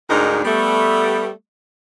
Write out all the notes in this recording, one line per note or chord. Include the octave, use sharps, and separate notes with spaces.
D2 G#2 D4 D#4 G#4 A#4
G3 A3 B3